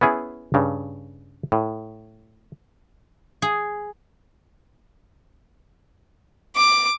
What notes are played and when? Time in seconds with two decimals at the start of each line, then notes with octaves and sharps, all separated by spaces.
0.01 B3 C#4 E4 G#4
0.54 G2 C#3
1.52 A2
3.42 G#4
6.56 D6